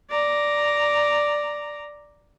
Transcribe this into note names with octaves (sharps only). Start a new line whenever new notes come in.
D5 A#5